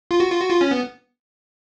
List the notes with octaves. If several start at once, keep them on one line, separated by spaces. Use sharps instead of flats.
F4
F#4
F4
F#4
F4
C#4
B3